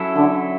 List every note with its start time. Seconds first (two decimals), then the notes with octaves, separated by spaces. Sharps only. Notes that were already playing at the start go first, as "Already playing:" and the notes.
Already playing: F#3 C#4 E4 A4
0.16 D3